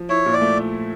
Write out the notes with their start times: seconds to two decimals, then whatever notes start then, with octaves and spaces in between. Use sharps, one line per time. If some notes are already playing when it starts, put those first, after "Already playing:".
Already playing: F3
0.09 E4 C#5
0.26 A#2
0.33 D5
0.41 A3